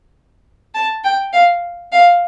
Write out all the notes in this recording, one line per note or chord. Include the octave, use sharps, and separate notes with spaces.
A5
G5
F5
F5